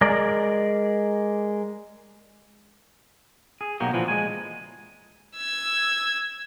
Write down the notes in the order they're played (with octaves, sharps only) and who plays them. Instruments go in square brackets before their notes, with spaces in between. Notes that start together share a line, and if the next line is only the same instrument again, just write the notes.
[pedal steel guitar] G#3 A#4 D5
[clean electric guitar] G#4
B1 A#3 F#4 G4
A#2 D3 E3 F3
G#3 G#5
[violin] E6 G#6